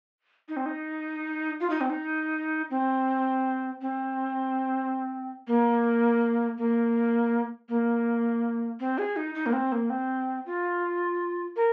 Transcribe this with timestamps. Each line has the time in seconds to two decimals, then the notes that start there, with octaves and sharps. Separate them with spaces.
0.49 D#4
0.57 C4
0.66 D#4
1.60 F4
1.70 D#4
1.81 C4
1.90 D#4
2.70 C4
3.82 C4
5.48 A#3
6.58 A#3
7.69 A#3
8.80 C4
8.98 G#4
9.16 D#4
9.35 D#4
9.46 A#3
9.53 C4
9.72 A#3
9.90 C4
10.46 F4
11.57 A#4